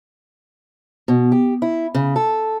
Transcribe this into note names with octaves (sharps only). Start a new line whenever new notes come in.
B2
G4
E4
C#3
A4